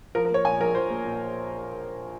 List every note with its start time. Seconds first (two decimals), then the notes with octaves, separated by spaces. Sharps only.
0.15 F3 A#4
0.25 A#4
0.30 A#3 C#5
0.45 A#2 G#5
0.60 A#1 A#4
0.75 F3 C5
0.90 A#3
1.05 A#2